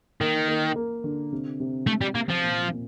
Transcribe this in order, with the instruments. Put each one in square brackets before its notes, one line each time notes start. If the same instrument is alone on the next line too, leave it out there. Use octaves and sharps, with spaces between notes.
[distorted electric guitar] D#3 [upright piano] A#3
[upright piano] A#3
A#3
D3
C3
C3
[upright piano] C3 [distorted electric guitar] A3
[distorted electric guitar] G3
[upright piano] C3 [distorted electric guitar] A#3
[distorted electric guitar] F3
[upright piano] A#2
A#2